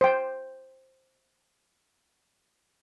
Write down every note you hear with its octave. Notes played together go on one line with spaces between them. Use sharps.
C5 G5